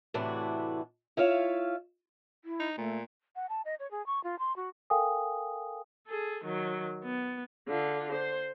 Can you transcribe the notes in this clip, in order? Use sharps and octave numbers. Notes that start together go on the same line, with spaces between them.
A2 C3 E3 A3 D4 F#4
E4 F4 C#5 E5 F5
E4
D#4
A#2 A3
F#5
A5
D#5
C#5
G#4
C#6
F4
C6
F#4
A4 A#4 F5 G5 G#5 D#6
G#4 A4
D#3 F#3
B3
D3 F4
C5